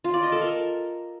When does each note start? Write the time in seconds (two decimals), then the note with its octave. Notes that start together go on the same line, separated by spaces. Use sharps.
0.04 F4
0.14 D5
0.23 D#5
0.32 A4
0.42 A#4